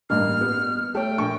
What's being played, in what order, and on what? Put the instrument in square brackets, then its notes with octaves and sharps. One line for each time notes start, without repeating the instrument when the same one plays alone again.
[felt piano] A1 G2 A#3 [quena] F6
[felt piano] B3
[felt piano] A3 C#5 [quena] G5
[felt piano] A#1 C#6